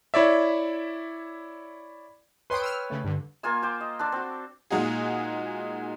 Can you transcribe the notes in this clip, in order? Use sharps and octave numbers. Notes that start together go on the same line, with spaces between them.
E4 C#5 D5 E5
B4 C#5 G5 C6 D#6 D7
E6 F6
C#3 A3
G2 D3
A#3 F4 G#5 E6
C5 G5 D6
D#5
D4 A4 D6
C4 F#4
A#2 G#3 D#4 F#4 G#4